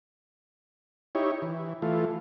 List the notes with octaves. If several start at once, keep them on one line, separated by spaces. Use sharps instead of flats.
D#4 E4 G4 C#5
E3
E3 A3 F4